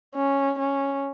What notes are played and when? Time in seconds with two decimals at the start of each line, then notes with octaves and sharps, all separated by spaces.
0.15 C#4
0.59 C#4